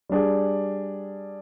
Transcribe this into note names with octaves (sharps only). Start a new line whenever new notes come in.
G3 D4 G#4